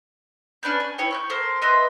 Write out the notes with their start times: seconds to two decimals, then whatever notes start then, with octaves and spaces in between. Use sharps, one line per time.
0.63 C#4 D4 B4 G6
0.80 G#5
0.98 E4 C#5 G5
1.11 C#6 F#6 G6
1.30 A4 A#4 C5
1.62 B4 D#5 E5 C6